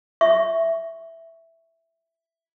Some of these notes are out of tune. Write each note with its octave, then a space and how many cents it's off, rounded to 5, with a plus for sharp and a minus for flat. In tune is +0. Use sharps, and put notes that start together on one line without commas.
E5 +0 C#6 +0